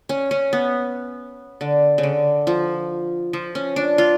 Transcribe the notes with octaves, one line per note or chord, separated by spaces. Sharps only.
C#4
C#4
B3
D3
C#3
D3
F3
F3
C#4
D4
F4